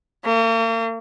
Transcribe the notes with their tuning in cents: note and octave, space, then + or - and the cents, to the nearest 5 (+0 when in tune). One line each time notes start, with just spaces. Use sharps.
A#3 -45